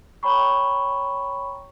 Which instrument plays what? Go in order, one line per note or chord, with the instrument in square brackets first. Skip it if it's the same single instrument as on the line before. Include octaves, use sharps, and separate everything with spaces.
[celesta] C#5 G5 A#5 B5 C#6